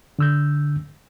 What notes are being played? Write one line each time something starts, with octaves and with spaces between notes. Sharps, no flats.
D3 E6 G6